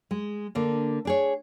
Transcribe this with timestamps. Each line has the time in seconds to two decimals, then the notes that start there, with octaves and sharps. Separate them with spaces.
0.11 G#3
0.55 D3 A#3 D4
1.05 D4 G#4 C#5